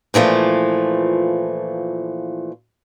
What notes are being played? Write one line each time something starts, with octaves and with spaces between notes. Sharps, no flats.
A#2 E3 F3 A3